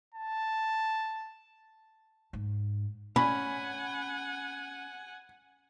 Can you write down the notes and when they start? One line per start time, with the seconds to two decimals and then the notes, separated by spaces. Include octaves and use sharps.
0.14 A5
2.33 G#2
3.16 C#4 F#5 G#5 B5